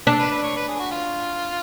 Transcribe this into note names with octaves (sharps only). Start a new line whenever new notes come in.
D4 A4
B4
B4
C#5
B4
G#4
F#4
F4